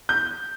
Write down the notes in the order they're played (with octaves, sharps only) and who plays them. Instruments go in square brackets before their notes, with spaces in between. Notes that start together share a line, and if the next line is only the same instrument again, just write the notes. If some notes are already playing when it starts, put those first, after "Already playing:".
[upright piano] G6